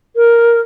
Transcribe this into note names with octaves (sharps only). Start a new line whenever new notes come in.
A#4